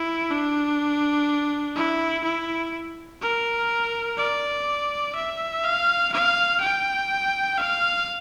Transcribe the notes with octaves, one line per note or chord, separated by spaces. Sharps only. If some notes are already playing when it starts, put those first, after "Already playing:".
Already playing: E4
D4
E4
E4
A#4
D5
E5
F5
F5
G5
F5